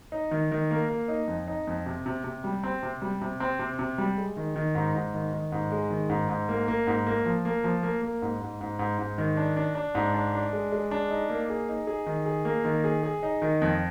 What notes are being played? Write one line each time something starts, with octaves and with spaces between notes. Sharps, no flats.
D#4
D#3
D#3
A#3
A#3
D#4
F2
D#4
F2
C3
C3
C3
G3
C4
C3
G3
C3
C4
C3
C3
G3
G#3
D#3
D#3
G#2
G#2
D#3
D#3
G#2
G#3
D#3
G#2
G#2
A#3
A#3
G#2
A#3
F3
A#3
F3
A#3
A#3
G#2
G#2
G#2
G#2
G#2
D#3
D4
D4
D4
G#2
D4
D4
G#3
G#3
D4
D#4
A#3
G#4
D#4
G#4
D#3
G#4
A#3
D#3
G#4
G#4
D#4
D#3
F2